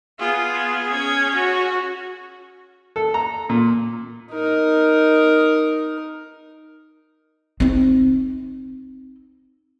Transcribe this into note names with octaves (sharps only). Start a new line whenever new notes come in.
B3 F4 G#4
C#4 C#5 G#6
F#4
A4
A#5
A#2
D#4 A#4
C4 D#4